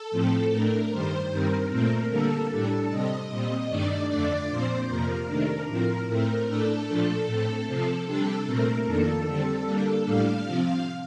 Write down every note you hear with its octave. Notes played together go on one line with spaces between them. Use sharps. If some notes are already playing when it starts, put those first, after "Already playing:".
Already playing: A4
A2 F3 A3 C4
A2 A3 D4 A#4
G2 D#3 G3 C5
G2 D#3 G3 C4 A#4
A#2 A3 C4
D3 G3 A#3 A4
A2 G3 D4 A4
C3 G3 C4 D#5
A#2 G3 C4
G2 D#3 A3 D4 D5
F2 D3 A3 D4 D5
A#2 F3 C4 C5
F2 C3 F3 A#3 A#4
C3 D#3 A3 D4
A2 F3 C4 A#4
A2 A3 C4 A#4
A2 A3 D4 A4
A#2 F3 A3 D4
A2 A3 C4
C3 F3 C4 A4
C3 G3 D4 A4
A#2 A3 C4 A#4
F2 D#3 A#3 D4 A4
D3 G3 C4
D3 G3 A#3 D4
A2 G3 D4 F5
C3 F3 C4